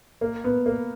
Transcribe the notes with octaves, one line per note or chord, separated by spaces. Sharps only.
A#3
B3
A#3